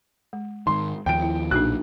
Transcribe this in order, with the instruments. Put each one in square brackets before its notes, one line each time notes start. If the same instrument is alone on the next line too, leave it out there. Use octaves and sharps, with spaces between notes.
[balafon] G#3
[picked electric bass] G#2 D#3 [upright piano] C6
[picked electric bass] D#2 F3 [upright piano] G5 D7
[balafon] E4
[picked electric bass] B1 A#2 [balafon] D4 D#4 F#4 [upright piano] F#6